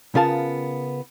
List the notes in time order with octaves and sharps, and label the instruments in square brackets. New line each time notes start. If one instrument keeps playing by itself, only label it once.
[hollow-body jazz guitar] C#3 B3 F4 A#4 A5